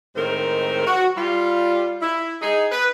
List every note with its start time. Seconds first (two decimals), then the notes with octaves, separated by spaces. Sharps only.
0.15 A2 D#3 G#3 C4 A#4 C5
0.86 F#4
1.17 G3 F4
2.02 E4
2.42 D#4 G#4
2.71 B4